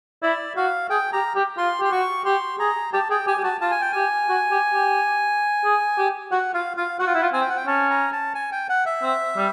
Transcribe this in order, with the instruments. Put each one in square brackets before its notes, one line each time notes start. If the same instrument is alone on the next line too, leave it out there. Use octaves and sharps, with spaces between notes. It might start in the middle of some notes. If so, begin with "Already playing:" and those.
[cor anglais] E4 [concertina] D5
[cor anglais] F#4 [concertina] F5
[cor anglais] G#4 [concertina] G5
[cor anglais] G4 [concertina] A#5
[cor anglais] G4
[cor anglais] F4 [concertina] C6
[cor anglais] G4 [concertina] C6
[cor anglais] F#4 [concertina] C#6
[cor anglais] G4 [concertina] C6
[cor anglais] G#4 [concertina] A#5
[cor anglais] G4 [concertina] A5
[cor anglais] G#4 [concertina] G5
[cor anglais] G4 [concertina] G#5
[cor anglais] G4
[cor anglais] F#4 [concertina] A5
[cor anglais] F4 [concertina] A5
[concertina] G#5
G5
[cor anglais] G4 [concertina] G#5
[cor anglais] F#4
G4
G4
G#4
G4
[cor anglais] F#4 [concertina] F#5
[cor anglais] F4 [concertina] F5
[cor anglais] F4 [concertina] F5
[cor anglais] F#4 [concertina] F#5
[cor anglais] F4
E4
F4
[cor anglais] C4 [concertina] G#5
[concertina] G5
F#5
G5
[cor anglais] C#4 [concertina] A5
[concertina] A#5
A5
G#5
G5
F#5
E5
[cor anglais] C4
G3